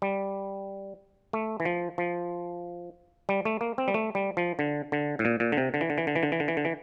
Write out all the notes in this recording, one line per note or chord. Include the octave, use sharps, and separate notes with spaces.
G3
A3
E3
F3
F3
G3
A3
A#3
C4
G3
A3
G3
F3
D3
D3
A2
A#2
A#2
D3
C3
D3
E3
D3
E3
D3
E3
D3
E3
D3
E3
D3
E3